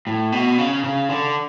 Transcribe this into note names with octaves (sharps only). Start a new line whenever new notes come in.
A2
B2
C#3
C#3
D3